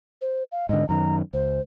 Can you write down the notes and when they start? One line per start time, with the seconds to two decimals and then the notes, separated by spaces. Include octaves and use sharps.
0.21 C5
0.52 F5
0.69 G#2 D3 D#5
0.89 F#2 D#3 A#5
1.33 C#2 C5